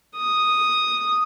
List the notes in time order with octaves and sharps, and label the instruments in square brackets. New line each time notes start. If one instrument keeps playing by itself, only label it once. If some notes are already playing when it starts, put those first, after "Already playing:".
[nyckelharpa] D#6